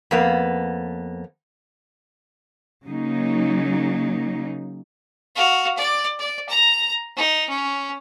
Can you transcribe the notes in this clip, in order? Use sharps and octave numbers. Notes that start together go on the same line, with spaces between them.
F2 A#3 B3
C#3 F#3 A#3 D#4
F#4 F5
D5
D5
A#5
D#4
C#4